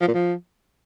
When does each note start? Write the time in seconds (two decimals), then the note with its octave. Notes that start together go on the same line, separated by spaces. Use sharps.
0.01 F3
0.08 A#2
0.14 F3